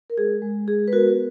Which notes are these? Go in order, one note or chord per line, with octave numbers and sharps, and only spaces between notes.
A#4
G#3 G#4
G#3
G#3 G#4
B4
B3 F#4 A#4